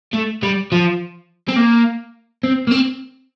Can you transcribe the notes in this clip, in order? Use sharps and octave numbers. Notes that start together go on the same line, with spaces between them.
A3
G3
F3
C4
A#3
C4
A#3
C4